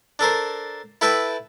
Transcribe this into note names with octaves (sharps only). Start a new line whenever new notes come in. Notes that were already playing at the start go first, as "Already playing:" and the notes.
D4 A4 A#4 C5
E4 A4 B4 E5 G5 A5